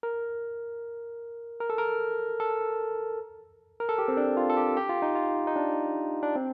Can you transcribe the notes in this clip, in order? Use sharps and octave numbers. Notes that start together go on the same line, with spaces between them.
A#4
A#4
A4
A#4
A4
A#4
A4
G4
C4
D4
F4
A4
G4
G4
F4
D#4
F4
D#4
D4
D4
C4